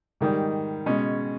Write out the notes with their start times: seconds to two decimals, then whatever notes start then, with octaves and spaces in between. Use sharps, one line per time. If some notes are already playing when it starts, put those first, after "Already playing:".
0.21 G#2 D#3 G3
0.86 B2 G#3 C#4